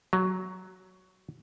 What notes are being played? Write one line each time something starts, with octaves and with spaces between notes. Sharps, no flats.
F#3